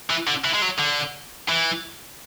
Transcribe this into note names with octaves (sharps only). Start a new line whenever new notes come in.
E3
D3
E3
G#3
F#3
D3
E3